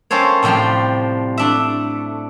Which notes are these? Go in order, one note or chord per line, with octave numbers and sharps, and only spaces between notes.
G3 A#3 C#4 A4 C5 C#5
A2 C3 F3 G3 C6
A3 D4 E5